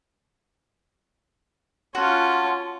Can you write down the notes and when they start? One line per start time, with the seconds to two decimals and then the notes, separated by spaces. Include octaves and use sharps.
1.95 C#4 F4 F#4 A5 C6